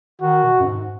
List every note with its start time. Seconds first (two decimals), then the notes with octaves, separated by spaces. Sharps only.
0.21 D#3 F#4
0.44 B2
0.59 F#2
0.65 G#2